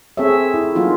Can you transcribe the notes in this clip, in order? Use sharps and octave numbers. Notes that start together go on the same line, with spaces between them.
C4 G#4 A4 C#5 E5
E4
F#3 A#3 D#4 F4 F#4